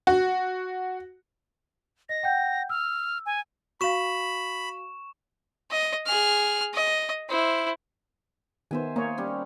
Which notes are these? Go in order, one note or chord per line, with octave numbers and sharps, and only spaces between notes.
F#4
D#5 A#6
F#5 G5 G6
E6 F6
G#5
F#4 F5 B5 C#6 E7
D#5
G#4 F6
D#5
E4 C5
D#3 B3 C5 E5 G#5
A#3 D#4 C#5
G3 C#4